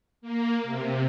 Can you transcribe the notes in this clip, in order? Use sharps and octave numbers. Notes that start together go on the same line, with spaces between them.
A#3
C3